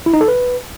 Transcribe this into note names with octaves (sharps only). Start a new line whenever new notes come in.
E4
D#4
A4
B4